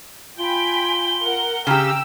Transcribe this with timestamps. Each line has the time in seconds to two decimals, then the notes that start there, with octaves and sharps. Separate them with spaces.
0.38 F4 G5 G#5 B5 G7
1.22 A#4 F#5
1.67 C#3 G4 G5 A#5 E6